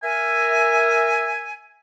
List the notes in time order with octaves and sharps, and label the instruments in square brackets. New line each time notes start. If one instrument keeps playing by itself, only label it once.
[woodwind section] A#4 E5 G#5